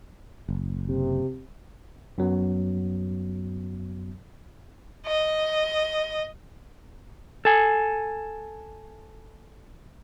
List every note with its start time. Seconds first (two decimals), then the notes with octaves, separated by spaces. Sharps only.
0.49 F#1
0.88 C3
2.18 F#2 F#3 B3
5.07 D#5
7.45 A4 G#5